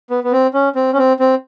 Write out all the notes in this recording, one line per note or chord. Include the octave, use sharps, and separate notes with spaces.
B3
B3
C4
C#4
C4
C#4
C4
C4